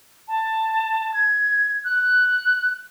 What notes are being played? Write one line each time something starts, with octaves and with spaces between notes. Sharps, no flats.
A5
G#6
F#6